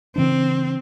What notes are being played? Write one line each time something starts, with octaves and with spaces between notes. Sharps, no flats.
C#3 E3 C4 D4